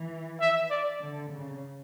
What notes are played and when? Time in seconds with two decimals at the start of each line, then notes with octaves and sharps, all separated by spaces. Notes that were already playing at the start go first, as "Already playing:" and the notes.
Already playing: E3
0.40 E5
0.70 D5
1.01 D3
1.31 C#3